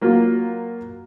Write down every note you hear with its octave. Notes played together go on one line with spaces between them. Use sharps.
F#3 A#3 F4